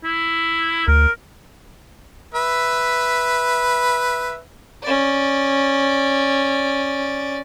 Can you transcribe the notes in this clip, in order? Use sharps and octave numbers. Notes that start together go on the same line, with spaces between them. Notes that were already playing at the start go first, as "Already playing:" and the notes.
E4
D2 A#4
B4 E5
C#4 D5